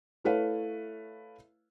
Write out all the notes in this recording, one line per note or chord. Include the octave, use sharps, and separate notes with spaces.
A3 E4 A4 B4 C#5 F5